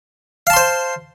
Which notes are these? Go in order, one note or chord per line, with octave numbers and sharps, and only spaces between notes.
C5 F5 A5 C6